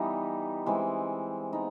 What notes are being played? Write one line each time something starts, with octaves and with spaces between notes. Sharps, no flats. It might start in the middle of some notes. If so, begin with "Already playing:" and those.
Already playing: E3 G3 B3 D#4
E3 G#3 C4
B3 D#4